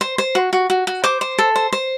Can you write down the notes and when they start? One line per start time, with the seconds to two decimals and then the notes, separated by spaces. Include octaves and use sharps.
0.01 C5
0.18 C5
0.35 F#4
0.53 F#4
0.70 F#4
0.87 F#4
1.04 C5 D6
1.21 C5
1.38 A4
1.56 C5
1.73 C5